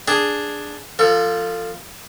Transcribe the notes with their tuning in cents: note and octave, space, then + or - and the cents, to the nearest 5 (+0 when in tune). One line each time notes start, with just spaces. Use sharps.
D4 +0 G#4 +0
F3 +0 A4 +30